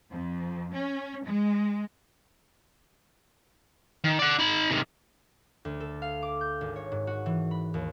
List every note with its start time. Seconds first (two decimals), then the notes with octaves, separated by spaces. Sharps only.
0.11 F2
0.74 C#4
1.25 G#3
4.04 D#3
4.19 D5 F#5
4.39 D#4 B5
4.70 C3 D#3
5.65 D2
5.80 A4
6.02 F5
6.22 D6
6.41 G6
6.61 G#1
6.76 C#5
6.92 G#2
7.07 F#4
7.26 E3
7.51 B5
7.74 D#2